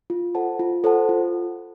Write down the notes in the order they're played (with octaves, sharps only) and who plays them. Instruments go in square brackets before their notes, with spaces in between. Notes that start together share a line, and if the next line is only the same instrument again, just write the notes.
[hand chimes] F4
A4 C5 F#5 A5
F4
A4 C5 F#5 A5
F4